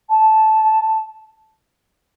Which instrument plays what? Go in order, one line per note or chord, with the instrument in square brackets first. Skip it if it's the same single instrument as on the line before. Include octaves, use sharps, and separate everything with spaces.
[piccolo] A5